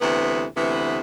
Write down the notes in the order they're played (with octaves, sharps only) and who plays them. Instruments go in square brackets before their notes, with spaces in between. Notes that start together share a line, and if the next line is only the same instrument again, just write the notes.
[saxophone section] D2 C3 E3 B3
D2 C3 E3 B3